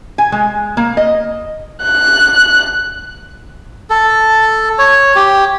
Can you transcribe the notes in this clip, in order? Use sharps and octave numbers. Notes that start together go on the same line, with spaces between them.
G#5
G#3
A#3
D#5
F#6
A4
C#5
G4